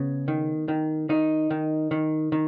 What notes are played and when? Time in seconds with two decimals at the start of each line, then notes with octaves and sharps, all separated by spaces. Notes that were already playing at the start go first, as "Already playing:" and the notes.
Already playing: C#3 B3
0.28 D#3
0.68 D#3
1.09 D#3 D#4
1.51 D#3
1.91 D#3
2.32 D#3